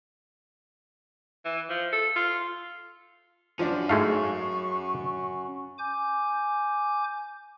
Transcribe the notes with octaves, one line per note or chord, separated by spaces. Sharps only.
E3
F3
A4
F4
F3 C#4 D4 F#4
G#2 G#3 A3 F5 C#6
G#5 D6 G6